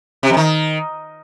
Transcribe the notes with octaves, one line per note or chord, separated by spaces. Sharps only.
C3
F2
D#3